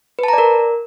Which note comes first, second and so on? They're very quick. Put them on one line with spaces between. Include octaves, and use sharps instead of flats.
B4 A5 A#5 D5 A#4